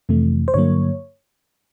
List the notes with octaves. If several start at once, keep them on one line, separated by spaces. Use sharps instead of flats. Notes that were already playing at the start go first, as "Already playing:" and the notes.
F2 C3 E3 A3
C5
G2 D3 F#3 A#3 C#5